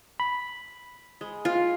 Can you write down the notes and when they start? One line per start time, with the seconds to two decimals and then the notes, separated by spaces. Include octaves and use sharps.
0.20 B5
1.21 G#3
1.45 F4